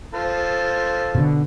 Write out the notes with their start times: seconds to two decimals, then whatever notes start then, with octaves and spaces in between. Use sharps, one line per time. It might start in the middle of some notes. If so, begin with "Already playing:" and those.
0.14 F4 A4 C5
1.15 B2 D3